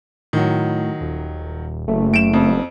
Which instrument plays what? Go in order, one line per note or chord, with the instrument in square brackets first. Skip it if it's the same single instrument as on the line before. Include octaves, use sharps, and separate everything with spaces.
[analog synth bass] A2 [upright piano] D#3 F#3
[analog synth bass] D#1
[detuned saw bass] F#1 [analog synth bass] A3
[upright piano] D7 E7
F2